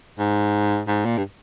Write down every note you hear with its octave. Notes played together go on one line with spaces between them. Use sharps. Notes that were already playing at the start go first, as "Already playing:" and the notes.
G#2
G#2
A#2
G2